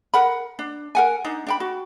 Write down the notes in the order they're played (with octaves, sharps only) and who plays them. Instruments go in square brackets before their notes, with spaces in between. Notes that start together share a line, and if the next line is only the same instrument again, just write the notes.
[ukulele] A#4 F#5 B5
D4
A#4 F#5 G#5
D4 D#4
D4 G5 B5
F#4